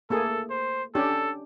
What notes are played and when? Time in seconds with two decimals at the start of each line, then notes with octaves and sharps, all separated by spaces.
0.10 A3 A#3 G#4 A4
0.50 C5
0.95 C#4 D4 G4 A4